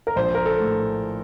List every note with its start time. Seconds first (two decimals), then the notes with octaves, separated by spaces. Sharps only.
0.07 A#4
0.16 A#1 C5
0.35 A#4
0.46 A4
0.60 A2